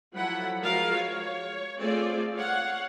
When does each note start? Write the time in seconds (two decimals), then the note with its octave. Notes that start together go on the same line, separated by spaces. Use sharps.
0.14 F3 F#3 E4 A4 F#5 B5
0.63 F3 G#3 F4 F#4 A#4 F5
0.95 C#5
1.79 A3 C4 F4 G#4 D5
2.35 C#5 F5 F#5